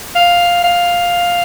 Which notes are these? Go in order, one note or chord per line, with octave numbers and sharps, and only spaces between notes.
F5
F5